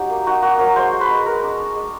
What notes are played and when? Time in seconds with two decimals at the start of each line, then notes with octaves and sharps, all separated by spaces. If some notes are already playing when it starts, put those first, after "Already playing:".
Already playing: F#3 C#4 D#4 G4
0.09 A#3
0.26 D#4 F#4
0.42 A#3 F#4
0.59 F#3 A#4
0.76 G#3 C5
0.93 G#3
1.01 B4
1.10 G#3
1.26 G#3 A#4
1.43 D4
1.59 D4
1.76 G#3